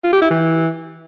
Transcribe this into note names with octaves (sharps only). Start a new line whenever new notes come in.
F4
G4
E4
E3